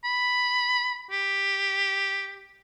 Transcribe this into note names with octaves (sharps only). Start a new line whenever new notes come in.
B5
G4